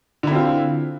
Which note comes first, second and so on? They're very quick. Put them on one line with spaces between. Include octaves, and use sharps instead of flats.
D3 E4 C4 F4